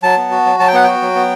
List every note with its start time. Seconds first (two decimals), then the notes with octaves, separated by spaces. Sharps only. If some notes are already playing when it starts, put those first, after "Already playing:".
0.03 F#3 A5
0.17 B3
0.31 F#4
0.45 F#3
0.60 F#3 A5
0.68 G5
0.74 B3 F#5
0.84 F#4 G5
1.02 F#3
1.15 B3